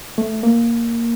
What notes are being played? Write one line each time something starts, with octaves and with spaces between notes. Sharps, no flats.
A3
A#3